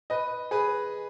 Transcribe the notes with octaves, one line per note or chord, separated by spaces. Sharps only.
B4 D#5
G#4 B4